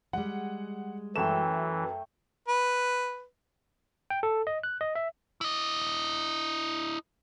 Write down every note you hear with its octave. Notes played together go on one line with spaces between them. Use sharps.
G3 G#3 F#5
F#2 E3 A3 G5 E7
B4
G5
A4
D#5
F#6
D#5
E5
E4 D#5